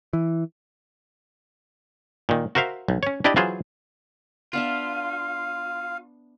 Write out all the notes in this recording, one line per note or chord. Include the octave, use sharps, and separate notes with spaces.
E3
A#2 D#3
F#4 A#4 C5 E5 F5
B1
C#4 C#5
D4 E4 G4 D5 D#5
E3 F#3 F4 G#4 C5
B3 D4 F4 E5 F5